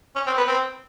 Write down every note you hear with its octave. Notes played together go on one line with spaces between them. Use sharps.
C#4
C4
B3
C4